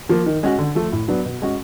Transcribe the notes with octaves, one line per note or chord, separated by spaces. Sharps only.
F3 A#3
D#3
G#3 C#4 F#4
D3
F3 A3
A2
F#3 B3 D4
B2
G#3 C#4 F#4